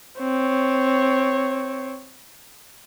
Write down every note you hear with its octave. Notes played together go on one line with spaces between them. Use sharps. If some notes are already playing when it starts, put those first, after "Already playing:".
C4 C#5